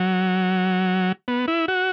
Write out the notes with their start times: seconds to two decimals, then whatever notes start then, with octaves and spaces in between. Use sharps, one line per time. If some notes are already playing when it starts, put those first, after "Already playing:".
Already playing: F#3
1.28 B3
1.48 E4
1.68 F#4